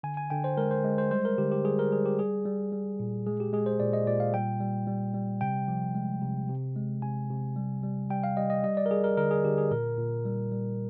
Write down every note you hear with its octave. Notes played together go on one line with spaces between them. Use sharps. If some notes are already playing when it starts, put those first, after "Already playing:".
D3 G#5
G#5
D3 G5
C5
G#3 A#4
C5
G#3
C5
G3 C5
A#4
D3 G4
G4
G3 G#4
A#4
G3 G#4
G4
G3 G#4
G3
G3
A#2
G#3 G#4
G4
G#3 G#4
C5
A#2 D5
D#5
A#2 D5
F5
G3 G5
G3
G3
G3
C3 G5
F3
G#3
C3
C3
G#3
C3 G#5
C3
G3
G3
G3 G5
F5
G3 D#5
D#5
G3 D#5
D5
A#4
G3 G#4
A#4
D3 A#4
G#4
D3 G4
G#4
A#2 A#4
A#2
G3
G3